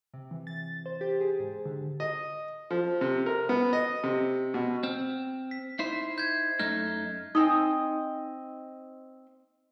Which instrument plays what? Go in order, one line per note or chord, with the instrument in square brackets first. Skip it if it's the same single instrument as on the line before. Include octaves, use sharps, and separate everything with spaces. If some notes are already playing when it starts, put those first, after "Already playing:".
[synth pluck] C3
E3
A6
C5
G4
G#4
G#2
D3
[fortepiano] D#5
F3
C3
A#4
B3
D#5
C3
B2
[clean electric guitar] C4 [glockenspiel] F6
[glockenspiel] B6
[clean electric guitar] D#4 E4 C5 [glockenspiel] C7
[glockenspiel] G6 G#6
[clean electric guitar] F#2 A3 D#4 [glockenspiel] F6
[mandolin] C4 D#5 [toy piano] D#4 G#5